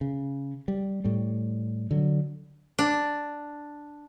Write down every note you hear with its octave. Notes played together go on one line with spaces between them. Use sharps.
C#3
G3
A2 G3
D3 F#3
D4